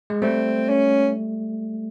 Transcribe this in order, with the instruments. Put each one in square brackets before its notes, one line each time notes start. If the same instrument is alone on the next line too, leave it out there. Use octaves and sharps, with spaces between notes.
[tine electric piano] G#3
[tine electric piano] G3 A3 [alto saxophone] C4
[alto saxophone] C#4